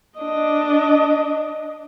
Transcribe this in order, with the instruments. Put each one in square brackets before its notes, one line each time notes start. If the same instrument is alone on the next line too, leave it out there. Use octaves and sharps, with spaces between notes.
[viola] D4 D#5